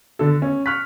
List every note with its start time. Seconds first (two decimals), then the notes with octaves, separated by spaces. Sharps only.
0.19 D3 D4 A4
0.42 C#4
0.66 C#6 F6 F#6 B6